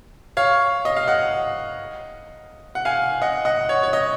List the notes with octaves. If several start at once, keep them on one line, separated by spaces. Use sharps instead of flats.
C#5 F5
D#5
F5
D#5 F#5
F#5
F5 G#5
D#5 F#5
D#5 F#5
C#5
C#5
D#5